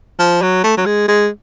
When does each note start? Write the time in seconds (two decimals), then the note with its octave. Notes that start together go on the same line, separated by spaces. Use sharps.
0.19 F3
0.42 F#3
0.64 A3
0.77 F#3
0.86 G#3
1.08 G#3